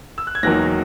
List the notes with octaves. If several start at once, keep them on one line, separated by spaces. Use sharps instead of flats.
E6
F#6
G#6
E1 E2 D#3 F#3 A#3 F#6 A#6